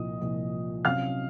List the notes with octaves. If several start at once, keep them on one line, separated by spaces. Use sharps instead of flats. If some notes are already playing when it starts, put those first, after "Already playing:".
Already playing: C2 A#2 F3 D#5 D#6
C2 A#2 F3
C3 F#3 C#4 F5 F6